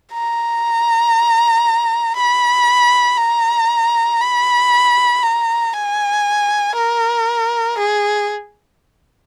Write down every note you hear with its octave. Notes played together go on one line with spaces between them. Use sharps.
A#5
B5
A#5
B5
A#5
G#5
A#4
G#4